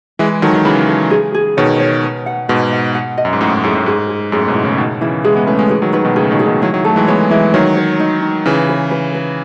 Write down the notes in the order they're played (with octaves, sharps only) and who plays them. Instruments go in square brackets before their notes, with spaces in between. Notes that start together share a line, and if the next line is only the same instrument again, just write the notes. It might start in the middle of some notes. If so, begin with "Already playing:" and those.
[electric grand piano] E3 G#3 [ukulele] E5
[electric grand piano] D#3 F#3 [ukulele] A4
[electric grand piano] D#3
[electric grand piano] C#3 E3 [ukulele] B5
[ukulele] A4
G#4
G#4
[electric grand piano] B2 D#3 [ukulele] C#5
[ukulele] C#5
B4
F#5
[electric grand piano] G#2 B2 [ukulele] B4
[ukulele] F#5
F#5
D#5
[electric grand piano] F#2
G#2
[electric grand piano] F#2 A2 [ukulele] F#5
[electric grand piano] F#2 A2 [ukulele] G#4
[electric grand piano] F#2 A2
[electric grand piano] G#2 [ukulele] G#4
[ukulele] G#4
[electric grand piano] F#2 A2 [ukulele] G#4
[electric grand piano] G#2 B2
[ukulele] E4
[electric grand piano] A2 C#3
[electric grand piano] B2 D#3 [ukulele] B4
[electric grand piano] C#3 E3 [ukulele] E4
[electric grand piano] E3 G#3 [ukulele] G#4
[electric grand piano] G#3 B3
[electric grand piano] A3 C#4 [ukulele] B4
[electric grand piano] G#3 B3
[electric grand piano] E3 G#3 [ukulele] G#4
[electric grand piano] D#3 F#3
[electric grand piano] D#3 F#3 [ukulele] B4
[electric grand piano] B2 D#3
[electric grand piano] A2 C#3 [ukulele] G#4
[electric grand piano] B2 D#3
[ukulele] G#4
[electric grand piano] B2 D#3
[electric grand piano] D#3 F#3 [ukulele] E4
[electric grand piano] D#3 F#3
[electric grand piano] F#3 A3 [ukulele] A4
[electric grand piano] E3 G#3
[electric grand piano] G#3 B3 [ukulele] C#5
[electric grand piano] E3 G#3 [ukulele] E4
[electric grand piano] D#3 F#3 [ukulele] C#5
[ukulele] C#5
D#4
D#4
[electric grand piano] C#3 E3 [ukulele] B4
[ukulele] B4
B4
B4